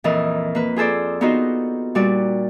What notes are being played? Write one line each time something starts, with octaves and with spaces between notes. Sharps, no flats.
F2 A#2 E3 A4 A#4 D#5
A#3 B4
F4 G#4 A4 C5 D5
B3 D#4 F4 F#4 C5 D#5
A#2 G3 F#4 D5